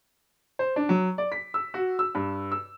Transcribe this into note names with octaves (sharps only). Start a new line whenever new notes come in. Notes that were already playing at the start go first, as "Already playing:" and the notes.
C5
D4
F#3
D5
B6
E6
F#4
E6
G2
E6